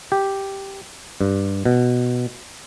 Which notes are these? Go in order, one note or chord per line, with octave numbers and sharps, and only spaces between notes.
G4
G2
B2